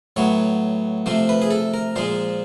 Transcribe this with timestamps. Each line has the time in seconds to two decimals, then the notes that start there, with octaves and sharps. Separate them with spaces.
0.16 A2 F#3 B3 C#5
1.06 C3 F3 A3 C5
1.29 B4
1.42 G#4
1.51 A4
1.74 A#4
1.96 A#2 F3 G#3 C5